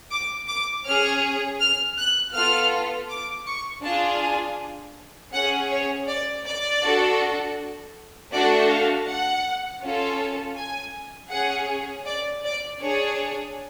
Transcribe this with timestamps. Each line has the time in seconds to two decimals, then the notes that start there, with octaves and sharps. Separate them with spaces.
0.11 D6
0.47 D6
0.85 C#4 G#4 F6
1.60 F6
1.98 F#6
2.34 B3 F4 A4 F6
3.09 D6
3.46 C#6
3.84 D4 F4 G#4 A5
4.21 G#5
5.33 C#4 G#4 F#5
5.71 C#5
6.08 D5
6.45 D5
6.83 D4 F#4 A4
8.32 A3 D4 F#4 A4 D5
8.69 F5
9.07 F#5
9.82 C#4 F4 A4
10.56 G#5
11.31 C#4 G#4 F#5
12.06 D5
12.44 D5
12.80 D4 G#4 C#5